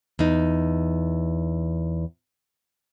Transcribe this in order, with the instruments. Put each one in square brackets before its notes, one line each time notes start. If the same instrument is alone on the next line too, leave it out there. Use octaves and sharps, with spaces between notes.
[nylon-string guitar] E2 D#4